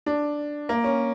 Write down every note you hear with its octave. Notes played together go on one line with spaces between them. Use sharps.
D4
A#3
C#4